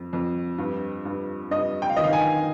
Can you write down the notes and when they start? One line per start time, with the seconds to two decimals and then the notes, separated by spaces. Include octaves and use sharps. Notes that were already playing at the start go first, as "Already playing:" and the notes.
Already playing: F2
0.13 F2
0.58 G2
1.05 G2
1.51 G2 D#5
1.82 G5
1.90 F5
1.97 D#3 D#5
2.04 F5
2.13 G#5